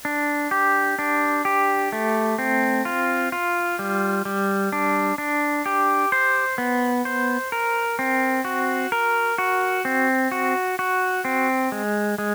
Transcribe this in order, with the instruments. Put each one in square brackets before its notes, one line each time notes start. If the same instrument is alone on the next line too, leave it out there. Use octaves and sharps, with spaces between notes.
[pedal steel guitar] D4
G4
D4
G4
A3
C4
F4
F4
G3
G3
D4
D4
G4
C5
B3
C5
A#4
C4
F#4
A#4
F#4
C4
F#4
F#4
C4
G#3
G#3